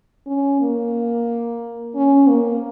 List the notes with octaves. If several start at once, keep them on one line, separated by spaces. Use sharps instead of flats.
C#4
A#3
C#4
A#3